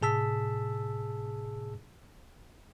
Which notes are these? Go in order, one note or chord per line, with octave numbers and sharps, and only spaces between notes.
A2 C3 G#4 A5 E6 B6